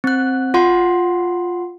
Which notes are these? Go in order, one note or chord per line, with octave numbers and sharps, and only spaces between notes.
C4 F#6
F4 F#5 C6